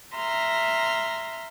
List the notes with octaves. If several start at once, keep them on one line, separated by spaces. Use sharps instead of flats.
E5 A#5 C6 F6